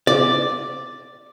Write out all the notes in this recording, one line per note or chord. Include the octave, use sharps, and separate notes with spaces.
D5